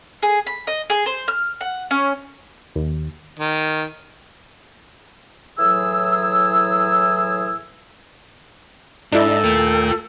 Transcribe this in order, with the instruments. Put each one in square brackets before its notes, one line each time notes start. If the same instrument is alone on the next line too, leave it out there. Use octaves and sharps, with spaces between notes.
[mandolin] G#4
B5
D#5
G#4
C5
F6
F#5
C#4
[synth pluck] D#2
[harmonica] D#3
[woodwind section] A2 E3 F#3 G#4 E6
[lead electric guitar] G#2 [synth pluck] D4 E4 [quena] A4 [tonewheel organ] D#5 A#5
[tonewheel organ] D#2 A3 G5 [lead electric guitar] F4 A#4